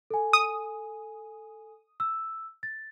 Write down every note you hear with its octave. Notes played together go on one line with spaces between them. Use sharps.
A4 G#5
D#6
E6
A6